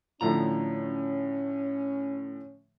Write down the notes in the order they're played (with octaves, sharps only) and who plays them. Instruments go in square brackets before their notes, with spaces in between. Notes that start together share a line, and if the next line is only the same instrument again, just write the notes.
[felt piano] A2 D3 F3 [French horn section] C#4 [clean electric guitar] A#5